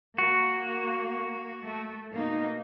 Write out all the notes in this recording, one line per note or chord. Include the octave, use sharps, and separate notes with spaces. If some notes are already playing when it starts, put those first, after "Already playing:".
A#3 F#4
A3
B2 A#3 D#4